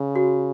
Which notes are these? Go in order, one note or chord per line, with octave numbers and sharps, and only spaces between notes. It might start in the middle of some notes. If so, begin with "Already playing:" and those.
Already playing: C#3
F#4